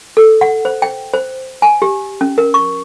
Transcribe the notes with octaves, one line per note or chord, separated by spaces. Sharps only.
A4
F#5
C5
G5
C5
G#5
G4
C#4
A#4
C#6